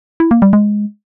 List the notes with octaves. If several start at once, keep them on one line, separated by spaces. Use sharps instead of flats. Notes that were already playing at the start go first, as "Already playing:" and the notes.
E4
A#3
G3
G#3